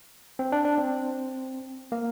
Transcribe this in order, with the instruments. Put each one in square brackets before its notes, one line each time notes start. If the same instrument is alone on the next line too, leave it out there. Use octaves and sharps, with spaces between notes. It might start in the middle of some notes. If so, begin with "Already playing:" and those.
[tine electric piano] C4
D4
D4
C4
A#3